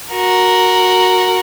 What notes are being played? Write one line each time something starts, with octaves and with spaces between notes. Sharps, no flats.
F#4 A#4